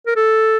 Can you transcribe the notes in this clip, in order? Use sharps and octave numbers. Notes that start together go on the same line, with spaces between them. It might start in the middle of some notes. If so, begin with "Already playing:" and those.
A#4
A4